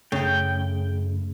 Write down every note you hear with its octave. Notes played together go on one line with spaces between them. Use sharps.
F#2 C#3 A3 G5